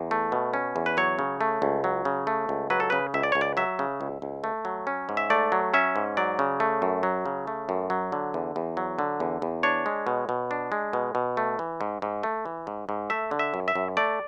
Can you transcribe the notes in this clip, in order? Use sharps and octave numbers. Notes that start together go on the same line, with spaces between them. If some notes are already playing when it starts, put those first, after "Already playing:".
Already playing: E2
A3
B2
C#4
E2
B4
F#3 C#5
C#3
A3
C#2
F#3
C#3
A3
C#2
F#3 B4
A4
C#3 B4
C#2 E5
D5
C#2 C#5
D5
F#3 E5
C#3
C#2
C#2
A3
F#3
C#4
G#2
E5
A3 D5
F#3
C#4 E5
G#2
F#3 D5
C#3
A3
F#2
F#3
C#3
A3
F#2
F#3
D3
E2
E2
F#3
D3
E2
E2
D4 C#5
G#3
B2
B2
D4
G#3
B2
B2
A3
E3
G#2
G#2
A3
E3
G#2
G#2
A3 E5
D3
E5
F#2
E5
F#2
A3 D5